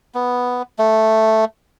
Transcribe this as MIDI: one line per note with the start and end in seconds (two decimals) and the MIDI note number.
0.14 0.62 59
0.79 1.45 57